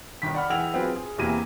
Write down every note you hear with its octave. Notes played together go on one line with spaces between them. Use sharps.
G1 D#3 B6
D5 F#5 B5 F6
E3 G#4 F#5 G5 E6 F7
F#3 C4 F4 G#4 B4
G#4
E2 C3 E3 A#3 D#7